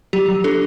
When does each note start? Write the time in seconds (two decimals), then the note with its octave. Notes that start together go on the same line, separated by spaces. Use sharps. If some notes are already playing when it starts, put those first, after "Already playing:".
0.13 F#3 G4
0.28 F#3
0.44 D4 A4